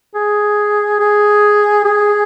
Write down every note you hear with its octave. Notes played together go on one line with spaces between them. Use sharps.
G#4
G#4
G#4